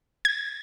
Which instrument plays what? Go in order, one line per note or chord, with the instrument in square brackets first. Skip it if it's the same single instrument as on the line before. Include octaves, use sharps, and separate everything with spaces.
[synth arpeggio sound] G#6